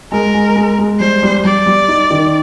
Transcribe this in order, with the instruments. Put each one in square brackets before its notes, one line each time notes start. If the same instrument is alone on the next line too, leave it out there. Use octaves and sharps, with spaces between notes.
[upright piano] G#3 [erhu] A#4
[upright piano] G#3
G#3
G#3
[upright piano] G3 [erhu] C5
[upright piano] G3
[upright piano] G3 [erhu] D5
[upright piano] G3
D#4
D#3